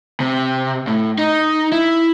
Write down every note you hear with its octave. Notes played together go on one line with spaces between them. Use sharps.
C3
A2
D#4
E4